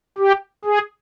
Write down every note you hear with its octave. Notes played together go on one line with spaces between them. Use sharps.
G4
G#4